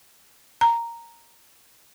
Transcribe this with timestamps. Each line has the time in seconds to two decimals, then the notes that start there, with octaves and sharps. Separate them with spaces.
0.61 A#5